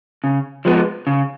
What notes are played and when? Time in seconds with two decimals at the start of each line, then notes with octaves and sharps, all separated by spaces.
0.24 C#3
0.65 F3 G#3 B3
1.07 C#3